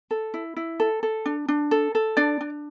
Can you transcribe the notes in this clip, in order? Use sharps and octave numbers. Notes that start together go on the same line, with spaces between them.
A4
E4
E4
A4
A4
D4
D4
A4
A4
D4 D5
D4